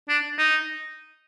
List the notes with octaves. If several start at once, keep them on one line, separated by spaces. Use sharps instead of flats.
D4
D#4